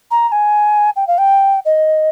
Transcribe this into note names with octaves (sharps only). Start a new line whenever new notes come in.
A#5
A#5
G#5
G5
F5
G5
D#5